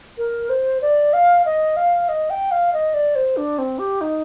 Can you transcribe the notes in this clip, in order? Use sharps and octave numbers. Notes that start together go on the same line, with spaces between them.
A#4
C5
D5
F5
D#5
F5
D#5
G5
F5
D#5
D5
C5
D4
C4
G4
D#4